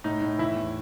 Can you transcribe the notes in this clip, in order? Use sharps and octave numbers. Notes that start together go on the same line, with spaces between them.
A2 D#4
A2
E3 E4
E2